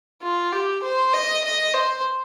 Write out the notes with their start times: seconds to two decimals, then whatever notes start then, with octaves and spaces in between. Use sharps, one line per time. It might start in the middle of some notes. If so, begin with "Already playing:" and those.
0.23 F4
0.53 G4
0.83 C5
1.13 D#5
1.44 D#5
1.74 C5